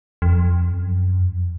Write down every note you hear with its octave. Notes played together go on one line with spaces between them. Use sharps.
F2
F#2
F2